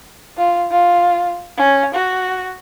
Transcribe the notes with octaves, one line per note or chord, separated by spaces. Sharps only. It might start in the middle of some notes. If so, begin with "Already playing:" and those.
F4
F4
C#4
F#4